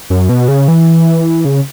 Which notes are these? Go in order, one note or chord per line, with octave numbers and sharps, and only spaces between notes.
F#2
B2
C#3
E3
C#3